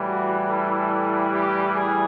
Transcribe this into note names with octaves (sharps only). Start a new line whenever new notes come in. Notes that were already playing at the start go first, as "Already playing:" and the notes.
Already playing: A2 E3 G3
F#4
A4
G4
G#4